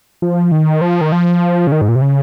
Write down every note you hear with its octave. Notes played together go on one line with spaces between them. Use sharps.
F3
D#3
F3
D#3
F3
C#3
D#3
G#2
A#2
C3
C#3